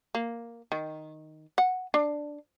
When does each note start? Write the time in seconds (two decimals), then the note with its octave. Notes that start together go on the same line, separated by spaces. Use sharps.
0.15 A#3
0.72 D#3
1.58 F#5
1.94 D4